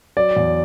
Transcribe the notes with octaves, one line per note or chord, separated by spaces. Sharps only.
F#3 D5
E2